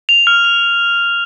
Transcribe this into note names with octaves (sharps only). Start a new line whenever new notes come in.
F7
F6
F7